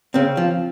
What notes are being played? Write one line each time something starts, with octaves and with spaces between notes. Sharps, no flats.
C#3 C4
F3